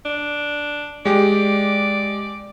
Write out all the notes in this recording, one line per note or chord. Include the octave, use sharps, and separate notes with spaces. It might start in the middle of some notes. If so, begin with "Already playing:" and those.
D4
G#3 G4 D5